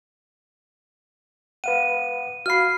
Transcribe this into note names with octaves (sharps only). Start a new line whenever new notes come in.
B4 F5 F#5 D#7
F#4 F5 B5 F6 C7